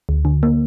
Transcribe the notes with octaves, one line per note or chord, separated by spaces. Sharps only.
D2
D3
A#3